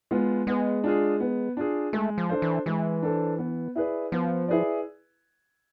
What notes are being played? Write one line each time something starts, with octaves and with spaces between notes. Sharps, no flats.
G#3 B3 F4
G#3 B3
D4 F4 G#4
B3
D4 F4 G#4
G#3 A3
F3
D4 A4 C5
E3
E3 G#3
D4 A4 C5
B3
E4 G#4 B4 D5
F3 B3
E4 G#4 B4 D5